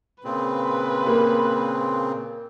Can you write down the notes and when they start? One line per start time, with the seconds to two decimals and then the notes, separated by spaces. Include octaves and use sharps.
0.24 A#2 C#3 C4 B4
1.07 A#3